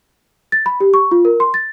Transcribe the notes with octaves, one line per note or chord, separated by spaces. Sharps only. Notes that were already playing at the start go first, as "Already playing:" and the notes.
A6
B5
G4
C#6
F4
A#4
C6
A6